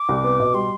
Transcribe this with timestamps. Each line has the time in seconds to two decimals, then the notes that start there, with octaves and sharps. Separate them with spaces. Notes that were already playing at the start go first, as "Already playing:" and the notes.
Already playing: D6
0.09 C2
0.24 B3
0.40 B2
0.54 G3 C6